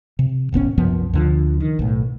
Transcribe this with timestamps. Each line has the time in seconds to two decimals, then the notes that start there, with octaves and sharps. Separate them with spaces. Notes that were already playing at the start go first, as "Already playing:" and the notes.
0.19 C3
0.52 D#1 G#1 B3 C#4
0.78 C2 F#2 F3 B3
1.14 D2 D3 F3
1.60 D#3
1.79 B1 A2